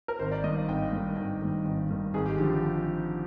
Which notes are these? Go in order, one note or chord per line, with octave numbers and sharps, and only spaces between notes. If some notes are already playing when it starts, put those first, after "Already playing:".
A#4
G#1 C5
D5
G2 D#3 D#5
F5
G#1 G5
G2 D#3
G#1 G5
G2 D#3
G#1
G2 D#3
G#1 G#4
G4
D3 F3 G4